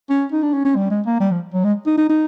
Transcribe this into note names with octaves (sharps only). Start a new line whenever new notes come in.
C#4
D#4
D4
C#4
C#4
G3
G#3
A#3
G3
F3
F#3
G#3
D#4
D#4
D#4